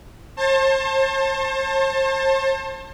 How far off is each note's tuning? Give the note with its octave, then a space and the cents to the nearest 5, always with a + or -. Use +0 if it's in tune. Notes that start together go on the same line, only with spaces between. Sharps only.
C5 +40 A5 +15